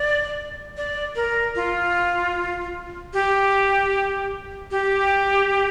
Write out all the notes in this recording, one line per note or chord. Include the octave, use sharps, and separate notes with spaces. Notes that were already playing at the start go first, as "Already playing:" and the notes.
Already playing: D5
D5
A#4
F4
G4
G4